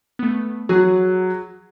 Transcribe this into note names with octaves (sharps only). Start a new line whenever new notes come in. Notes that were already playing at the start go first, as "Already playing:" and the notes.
A3 B3
F#3 G#4 F#5